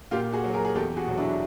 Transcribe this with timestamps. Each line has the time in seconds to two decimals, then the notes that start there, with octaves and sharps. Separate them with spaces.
0.11 A#2 F4 G4
0.33 F#4 G#4
0.44 F#3
0.54 G#4 A#4
0.65 G#4
0.75 E2 G4 A4
0.97 F#4 G#4
1.07 B2 F#3
1.18 D4 E4